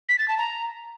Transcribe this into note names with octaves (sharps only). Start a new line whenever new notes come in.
B6
A6
A5
A#5